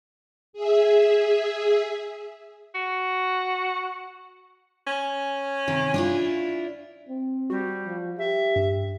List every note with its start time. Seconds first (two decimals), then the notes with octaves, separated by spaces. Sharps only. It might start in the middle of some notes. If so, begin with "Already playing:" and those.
0.53 G#4 E5
2.75 F#4
4.87 C#4
5.68 C3 D#3
5.94 D4 E4 F4
7.09 C4
7.50 G3 F#4
7.85 F3
8.18 G4 E5
8.56 G2